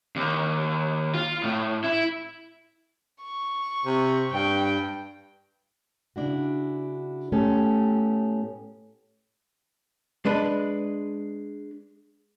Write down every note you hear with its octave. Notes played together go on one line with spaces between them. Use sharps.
D#2
F4
A2
E4
C#6
C3
G2 G5
C#3 D4 E4 F#4
A2 A3 B3 C#4 G4 A4
G#3 D4 B4